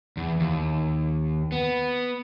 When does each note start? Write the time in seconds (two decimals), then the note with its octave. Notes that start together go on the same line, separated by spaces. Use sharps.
0.17 E2
0.40 D#2
1.52 B3